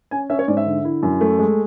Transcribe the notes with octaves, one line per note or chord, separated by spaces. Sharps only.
C#4 G#5
C#4 E5
C#5
G#2 D5
E5
D3
E4
F#2
A3
G#3